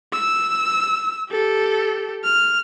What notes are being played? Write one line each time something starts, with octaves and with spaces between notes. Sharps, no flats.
E6
G4 A4
F6